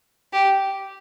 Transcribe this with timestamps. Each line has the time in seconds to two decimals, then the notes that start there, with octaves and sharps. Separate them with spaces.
0.33 G4